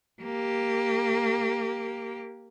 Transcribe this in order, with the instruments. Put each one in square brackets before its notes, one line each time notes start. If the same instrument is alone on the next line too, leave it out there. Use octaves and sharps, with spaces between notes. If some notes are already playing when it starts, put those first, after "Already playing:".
[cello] A#3 G4